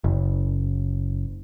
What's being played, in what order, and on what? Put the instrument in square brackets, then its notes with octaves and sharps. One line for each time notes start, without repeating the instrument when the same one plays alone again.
[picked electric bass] F#1